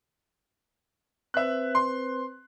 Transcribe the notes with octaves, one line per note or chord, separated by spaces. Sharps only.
C4 B4 C5 E5 F#6
C6